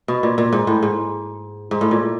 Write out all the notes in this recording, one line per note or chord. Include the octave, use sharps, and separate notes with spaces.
B2
A#2
A#2
G#2
A2
G#2
G#2
A2
A#2